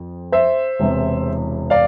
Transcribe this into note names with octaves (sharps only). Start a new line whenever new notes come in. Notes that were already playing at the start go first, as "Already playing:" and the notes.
Already playing: F2
C5 E5
E1 E2 C3 E3
D5 F5